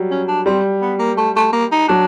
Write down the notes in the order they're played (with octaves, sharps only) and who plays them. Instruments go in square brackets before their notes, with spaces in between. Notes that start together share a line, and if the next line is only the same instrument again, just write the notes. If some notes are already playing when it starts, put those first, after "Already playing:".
Already playing: [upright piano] F#3 G3
[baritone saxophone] C#4
D4
[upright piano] G3 [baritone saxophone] C4
[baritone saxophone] B3
A#3
A3
A3
A#3
D#4
[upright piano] F#3 [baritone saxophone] D4